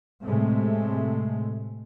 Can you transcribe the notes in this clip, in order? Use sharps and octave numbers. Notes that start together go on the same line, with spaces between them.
A2 C3 G#3 A3